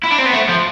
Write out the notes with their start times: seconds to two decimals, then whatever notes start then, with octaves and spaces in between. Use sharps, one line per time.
0.03 E4
0.10 D4
0.18 C4
0.26 B3
0.33 A3
0.49 F3